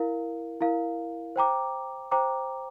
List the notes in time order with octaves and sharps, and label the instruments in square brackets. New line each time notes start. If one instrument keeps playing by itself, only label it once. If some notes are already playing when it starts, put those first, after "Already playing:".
Already playing: [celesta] E4 A#4 F5
E4 A#4 F5
C5 G5 A#5 D6
C5 G5 A#5 D6